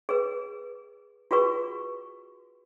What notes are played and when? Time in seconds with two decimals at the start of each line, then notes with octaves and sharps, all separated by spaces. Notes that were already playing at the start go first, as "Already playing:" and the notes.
0.09 G#4 B4
1.31 F4 F#4 G#4 B4 C#6